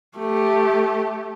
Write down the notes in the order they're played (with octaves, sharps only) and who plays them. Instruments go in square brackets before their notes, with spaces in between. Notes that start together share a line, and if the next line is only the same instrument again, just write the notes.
[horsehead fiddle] A3 G4